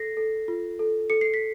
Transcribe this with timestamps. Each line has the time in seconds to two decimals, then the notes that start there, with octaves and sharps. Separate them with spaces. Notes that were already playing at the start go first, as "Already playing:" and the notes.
Already playing: A4 A#6 C7
0.17 A4
0.48 F4
0.79 A4
1.10 A4 C#7
1.21 C7
1.34 B6